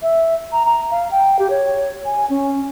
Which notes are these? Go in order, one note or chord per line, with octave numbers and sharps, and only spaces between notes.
E5
A#5
A#5
F5
G5
G4
C#5
G#5
C#4